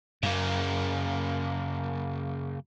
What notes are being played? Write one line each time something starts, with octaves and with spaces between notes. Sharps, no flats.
F#2 C#3 A#3